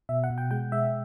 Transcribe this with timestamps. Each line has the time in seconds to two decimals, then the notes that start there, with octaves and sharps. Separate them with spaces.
0.09 B2 E5
0.24 F#5
0.30 B2
0.38 G5
0.51 G#3 G5
0.72 G#3 E5